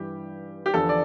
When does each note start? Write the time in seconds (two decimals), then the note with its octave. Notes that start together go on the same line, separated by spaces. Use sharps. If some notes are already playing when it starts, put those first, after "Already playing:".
Already playing: G2 E3 G4
0.66 G4
0.74 E2 D3 F3 A4
0.89 D5